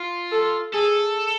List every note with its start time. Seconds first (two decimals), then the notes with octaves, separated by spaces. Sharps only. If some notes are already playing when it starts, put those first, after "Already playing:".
Already playing: F4
0.32 A4
0.73 G#4 A4